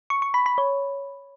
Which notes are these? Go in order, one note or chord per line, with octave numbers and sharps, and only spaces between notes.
C#6
C#6
B5
B5
C#5